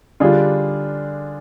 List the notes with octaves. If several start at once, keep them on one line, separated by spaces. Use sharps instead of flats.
D3 G3 D4 F4 G#4